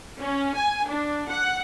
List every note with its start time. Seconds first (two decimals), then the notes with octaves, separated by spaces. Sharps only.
0.19 C#4
0.55 G#5
0.86 D4
1.28 F#5